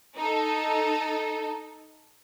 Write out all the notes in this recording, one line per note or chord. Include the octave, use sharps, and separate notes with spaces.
D#4 A4